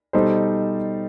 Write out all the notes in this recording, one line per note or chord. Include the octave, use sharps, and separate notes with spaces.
B2 G3 D#4 A4 C5